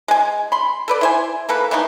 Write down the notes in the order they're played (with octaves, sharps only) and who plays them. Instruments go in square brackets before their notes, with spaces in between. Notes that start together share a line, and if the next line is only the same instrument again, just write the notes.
[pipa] G#3 G#5
B5 C6
A4 B4 D5
E4 C5 G#5
E3 A#3 A4 B4
E3 A3 A#3 D#4